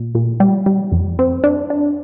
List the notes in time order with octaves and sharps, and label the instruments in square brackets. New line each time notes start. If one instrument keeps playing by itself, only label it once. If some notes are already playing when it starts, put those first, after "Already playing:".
Already playing: [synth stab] A#2
A#2
G3
G3
F2
C4
D4
D4